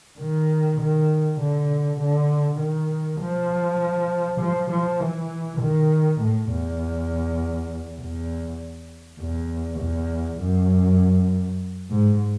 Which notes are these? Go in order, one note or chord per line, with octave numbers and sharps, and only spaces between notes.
D#3
D#3
D3
D3
D#3
F3
F3
F3
E3
D#3
A2
E2
E2
E2
E2
F#2
G#2